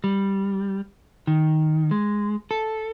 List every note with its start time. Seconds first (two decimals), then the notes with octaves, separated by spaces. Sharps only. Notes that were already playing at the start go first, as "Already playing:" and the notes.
0.04 G3
1.27 D#3
1.91 G#3
2.51 A4